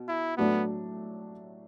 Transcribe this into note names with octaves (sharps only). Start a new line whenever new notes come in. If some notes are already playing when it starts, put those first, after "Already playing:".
Already playing: B2
E4
A2 F#3 A3 B3 D4